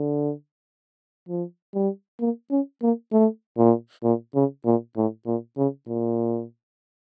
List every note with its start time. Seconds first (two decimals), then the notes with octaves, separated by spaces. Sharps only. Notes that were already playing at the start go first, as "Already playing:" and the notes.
Already playing: D3
1.29 F3
1.74 G3
2.21 A#3
2.51 C#4
2.82 A#3
3.12 A3
3.58 A#2
4.04 A#2
4.35 C#3
4.65 A#2
4.97 A2
5.27 A#2
5.58 C#3
5.88 A#2